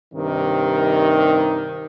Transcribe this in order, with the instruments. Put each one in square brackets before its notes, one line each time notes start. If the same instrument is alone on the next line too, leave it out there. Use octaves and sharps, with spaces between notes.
[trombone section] G2 C3 D#3